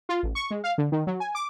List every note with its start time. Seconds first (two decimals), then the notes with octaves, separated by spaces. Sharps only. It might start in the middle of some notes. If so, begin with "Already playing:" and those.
0.09 F4
0.23 A1
0.35 C#6
0.51 G#3
0.64 F5
0.78 D3
0.92 D#3
1.07 F#3
1.20 G#5
1.35 D6